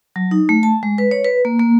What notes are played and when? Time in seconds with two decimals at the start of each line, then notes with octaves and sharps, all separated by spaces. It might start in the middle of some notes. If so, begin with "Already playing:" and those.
0.16 F#3
0.31 D#4
0.49 A3
0.63 A5
0.83 G#3
0.98 B4
1.11 C#5
1.24 B4
1.45 A#3
1.59 A#3